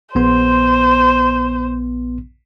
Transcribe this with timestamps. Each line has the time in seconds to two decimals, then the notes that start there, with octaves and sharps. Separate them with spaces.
0.15 A#1 B3 C5 C6